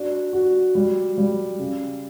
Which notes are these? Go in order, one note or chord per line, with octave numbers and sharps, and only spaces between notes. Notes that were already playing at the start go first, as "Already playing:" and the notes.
Already playing: D4 F#4
F#4
G3
G3
C#3